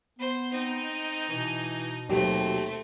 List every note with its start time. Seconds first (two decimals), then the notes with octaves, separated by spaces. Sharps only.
0.19 B3 C5
0.53 C4 D#4
1.29 B2 E3
2.09 D#2 F#3 A3 C4 F#4 G4